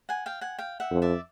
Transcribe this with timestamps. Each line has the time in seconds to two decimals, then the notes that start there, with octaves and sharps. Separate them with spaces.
0.09 F#5 G#5
0.26 F5 G5
0.41 F#5 G#5
0.59 F5 G5
0.80 E5 F#5
0.91 F2
1.02 D5 E5